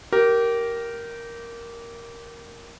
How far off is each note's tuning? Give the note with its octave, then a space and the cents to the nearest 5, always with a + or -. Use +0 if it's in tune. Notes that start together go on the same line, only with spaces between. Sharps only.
G4 -20 A#4 +0